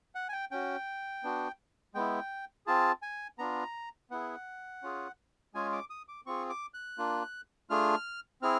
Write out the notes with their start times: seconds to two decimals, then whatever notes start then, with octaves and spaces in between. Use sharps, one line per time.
0.15 F#5
0.29 G#5
0.33 G5
0.51 C#4 F#4 G5
1.23 B3 D4 F#4
1.94 G#3 B3 E4 G5
2.67 C4 F4 G#4 A5
3.02 G#5
3.39 B3 D4 F4 A#5
4.11 B3 E4 G#4 F#5
4.83 C#4 F4 G#4
5.54 G#3 C#4 F4 G#4 G#5
5.72 D6
5.90 D#6
6.08 D6
6.26 C4 F4 G#4 C#6
6.50 D6
6.74 F#6
6.98 A#3 D4 F4
7.70 A3 D4 F4 G#4 F6
8.42 C4 E4 G#4 F6